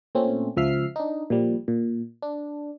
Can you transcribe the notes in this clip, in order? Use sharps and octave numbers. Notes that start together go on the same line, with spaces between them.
A#2 A3 C4 C#4
C#2 F3 E5 F6 C7
D4 D#4
A#2 F3 G3
A#2
D4